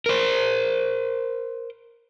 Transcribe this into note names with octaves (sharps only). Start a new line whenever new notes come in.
A#4 C5